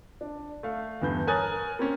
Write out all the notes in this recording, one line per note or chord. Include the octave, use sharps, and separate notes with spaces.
D4
A3 F5
E2 G2 G6
A#4 C#5 G#5 D#6 F#6 A6
A#3 C4 C#4